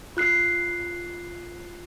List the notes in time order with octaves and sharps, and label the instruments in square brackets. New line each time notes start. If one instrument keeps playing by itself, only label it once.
[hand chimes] F4 F#6 C7